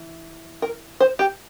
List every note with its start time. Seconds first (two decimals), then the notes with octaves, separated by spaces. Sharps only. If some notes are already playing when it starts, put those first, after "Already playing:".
Already playing: E3
0.62 A#4
1.00 C5
1.19 G4